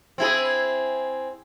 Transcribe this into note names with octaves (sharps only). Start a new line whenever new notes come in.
C4 E4 G#4